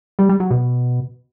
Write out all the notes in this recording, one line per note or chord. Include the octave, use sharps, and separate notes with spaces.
G3
G3
F#3
B2